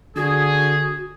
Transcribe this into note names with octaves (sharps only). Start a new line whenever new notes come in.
D3 F#4 G#4